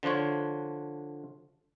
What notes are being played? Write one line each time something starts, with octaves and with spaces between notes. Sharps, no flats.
D3 F3 D4 F4 C#5